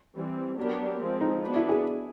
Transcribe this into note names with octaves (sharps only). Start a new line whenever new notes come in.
E3 G3 C4
F#3 B3 D4 G4 A#4
F3 G#3 C4
D#4
B3 D4 F#4 B4
E4
G#4